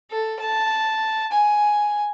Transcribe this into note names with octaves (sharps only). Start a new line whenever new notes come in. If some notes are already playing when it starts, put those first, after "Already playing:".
A4
A5
G#5